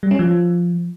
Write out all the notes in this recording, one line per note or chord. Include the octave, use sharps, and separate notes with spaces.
G3
C#4
F3